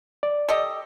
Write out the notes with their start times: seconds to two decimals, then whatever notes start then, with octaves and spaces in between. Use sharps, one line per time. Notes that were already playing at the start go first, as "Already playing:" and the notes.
0.23 D5
0.49 G4 A4 D#5